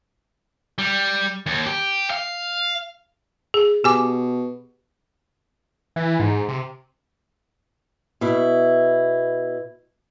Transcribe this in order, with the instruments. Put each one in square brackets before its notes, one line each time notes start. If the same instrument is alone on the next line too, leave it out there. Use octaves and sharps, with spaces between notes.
[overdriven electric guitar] G3
D#2
G4
F5
[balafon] G#4
[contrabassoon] B2 [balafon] G4 G#5 D6
[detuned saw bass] E3
G#2
C3
[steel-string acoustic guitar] B2 E4